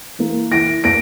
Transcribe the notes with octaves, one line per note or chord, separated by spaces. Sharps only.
E3 A#3
E3 A#6 D7
A#3 A#6 D7